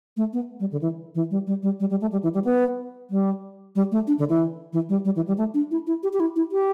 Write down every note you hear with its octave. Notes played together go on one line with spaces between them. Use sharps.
A3
B3
G3
D3
E3
E3
G3
G3
G3
G3
G3
A3
G3
E3
G3
B3
G3
G3
A3
D4
D3
E3
E3
G3
G3
E3
G3
A3
D4
E4
E4
G4
G4
E4
E4
G4